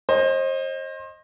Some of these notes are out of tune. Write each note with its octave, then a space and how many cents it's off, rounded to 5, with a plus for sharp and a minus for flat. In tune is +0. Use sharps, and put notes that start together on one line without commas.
C5 +35 D#5 +0